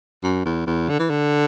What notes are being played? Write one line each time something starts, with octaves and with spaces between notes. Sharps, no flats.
F#2
E2
E2
D3
E3
D3